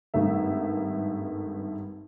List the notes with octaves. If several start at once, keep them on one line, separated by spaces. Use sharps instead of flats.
G#1 G2 A3 A#4 E5